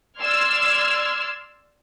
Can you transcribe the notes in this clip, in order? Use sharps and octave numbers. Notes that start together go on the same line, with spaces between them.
D5 C6 E6 F6 G#6